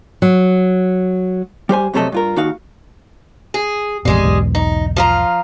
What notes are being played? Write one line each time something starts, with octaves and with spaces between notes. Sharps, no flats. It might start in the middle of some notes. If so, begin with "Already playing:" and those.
F#3
G3 G4 C5 G#5
F2 C3 F#3 A3 A4 D#5
G2 F4 A#4
D#2 D#4 F#4 F5
G#4
A1 F2 B2 G3 G#3 G#4
B1 E2 G#2
D#4
F3 F4 A#5